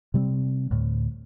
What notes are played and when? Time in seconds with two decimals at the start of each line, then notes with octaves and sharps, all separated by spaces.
0.14 C3 G3 B3 C4
0.71 D2 A2